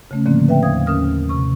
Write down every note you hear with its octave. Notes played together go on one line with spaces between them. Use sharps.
C#3 A3 C#4
A2 D3 F3 A#3 C4
B4 E5 G5
D#2 C5 F5 D#6 G#6
D#2 C#4 A#4 D#6 F6
C3 C#6